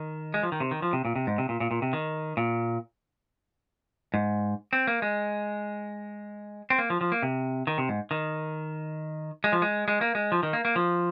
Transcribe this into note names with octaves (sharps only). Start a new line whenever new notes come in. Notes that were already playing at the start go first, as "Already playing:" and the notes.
Already playing: D#3
G#3
F3
D#3
C3
D#3
F3
C3
A#2
C3
G#2
C3
A#2
A#2
A#2
C3
D#3
A#2
G#2
C4
A#3
G#3
C4
A#3
F3
F3
A#3
C3
D#3
C3
G#2
D#3
G#3
F3
G#3
G#3
A#3
G#3
F3
D#3
A#3
A#3
F3